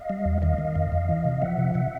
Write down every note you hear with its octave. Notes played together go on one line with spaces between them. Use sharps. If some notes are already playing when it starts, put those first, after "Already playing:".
Already playing: D#5 F5
G3
E2
D#3 D#5 F5
D#3
F2
F2
E3
C3
F3 E5 F#5
C3
C3 E5 F#5